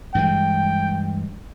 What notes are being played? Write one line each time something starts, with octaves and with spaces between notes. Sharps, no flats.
G2 E3 G#3 G5